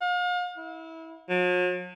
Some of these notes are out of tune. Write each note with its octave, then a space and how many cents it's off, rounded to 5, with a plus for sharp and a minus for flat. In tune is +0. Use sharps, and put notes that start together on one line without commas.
F5 +40
E4 -25
F#3 -45